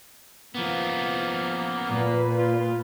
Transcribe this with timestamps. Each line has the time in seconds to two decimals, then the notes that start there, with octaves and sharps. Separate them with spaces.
0.55 F3 A#3 B3
1.90 A#2 A#3 B4
2.38 F4